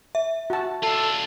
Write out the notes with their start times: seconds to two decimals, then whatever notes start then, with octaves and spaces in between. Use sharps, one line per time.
0.15 E5
0.50 F#4 A5
0.83 D4 F4 A4